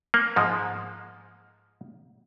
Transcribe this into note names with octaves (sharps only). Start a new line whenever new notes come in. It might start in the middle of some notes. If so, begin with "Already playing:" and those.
A#3
G#2 F3 G#3